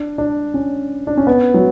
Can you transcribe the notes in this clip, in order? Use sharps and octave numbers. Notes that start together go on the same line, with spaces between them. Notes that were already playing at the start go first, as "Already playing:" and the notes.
Already playing: D4
D4
C#4
D4
C#4
B3
F#3